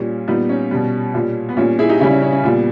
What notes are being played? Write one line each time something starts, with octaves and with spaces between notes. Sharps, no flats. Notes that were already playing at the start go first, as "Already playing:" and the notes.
Already playing: A#2 G3 C#4
A#2 G3 B3 D#4
C#4
B2 G3
A#2 G3
B3
A#2 G3 C#4
E4 G#4
D#4 G4
C#3 G3 C#4 E4
C#4
C#4
C#4
A#2 G3 B3